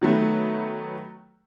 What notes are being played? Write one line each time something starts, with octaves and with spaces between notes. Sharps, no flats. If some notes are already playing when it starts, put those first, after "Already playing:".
D#3 F#3 A3 B3